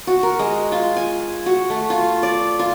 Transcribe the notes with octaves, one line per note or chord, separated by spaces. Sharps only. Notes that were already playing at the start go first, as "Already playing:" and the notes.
F#4
A#4
G#3
F4
G#5
F#4
A3
F4
D5
F4